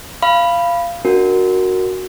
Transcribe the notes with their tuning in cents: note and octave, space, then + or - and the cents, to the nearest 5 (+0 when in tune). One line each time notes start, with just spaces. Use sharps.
F5 -20 B5 +0
D4 +5 F#4 +0 A#4 -5